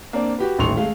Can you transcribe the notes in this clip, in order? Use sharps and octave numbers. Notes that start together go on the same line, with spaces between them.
A#3 C4 D4
F#4 G4 B4
D#1 A1 D#3 C6 C#6 F7
G#3 A3 F5